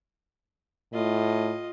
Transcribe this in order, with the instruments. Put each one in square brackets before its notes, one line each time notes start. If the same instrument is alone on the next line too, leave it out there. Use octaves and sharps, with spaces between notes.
[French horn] A2 [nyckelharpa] F4 D#5